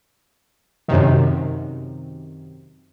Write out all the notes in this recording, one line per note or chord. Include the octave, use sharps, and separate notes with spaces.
F#2 C3 D#3